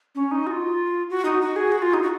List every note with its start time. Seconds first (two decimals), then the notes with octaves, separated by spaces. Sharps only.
0.15 C#4
0.31 D#4
0.47 F#4
0.51 F4
1.10 F#4
1.25 D#4
1.41 F#4
1.56 G#4
1.72 F#4
1.82 F4
1.94 D#4
2.03 F#4